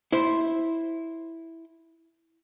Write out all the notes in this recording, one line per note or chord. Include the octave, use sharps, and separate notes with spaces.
E4 C5